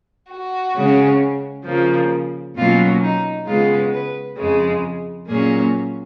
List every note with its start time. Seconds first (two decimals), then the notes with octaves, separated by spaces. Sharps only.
0.30 F#4
0.77 C#3 G#3 C#4
1.66 C#3 F3 A#3
2.57 B2 F#3 A#3 C#4 F4
3.03 D#4
3.47 C#3 G#3 B3 F4
3.94 B4
4.38 F2 C#3 G#3
5.28 A#2 F#3 A#3 C#4 G#4